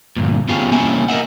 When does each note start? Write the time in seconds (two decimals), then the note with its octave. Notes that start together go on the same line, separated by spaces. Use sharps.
0.16 D2 G2 A#2
0.48 B3 C#4 F4 G4 G#4 C#5
0.71 C2 A#3 C#4 E4 C#5 G#5
1.09 A#4 C5 D#5 E5 F#5